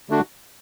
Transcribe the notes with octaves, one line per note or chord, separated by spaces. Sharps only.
D3 A3 D4 F#4